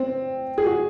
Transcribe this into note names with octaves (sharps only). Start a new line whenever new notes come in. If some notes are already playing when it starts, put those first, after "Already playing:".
Already playing: C4
G#4
F#4